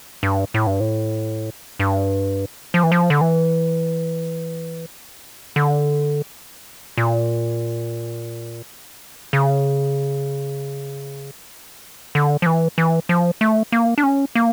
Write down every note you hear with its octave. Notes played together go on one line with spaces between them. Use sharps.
G2
A2
G2
A2
G2
F3
E3
F3
D3
E3
D3
A#2
C#3
D3
F3
E3
E3
F3
A3
A#3
D4
C#4
A#3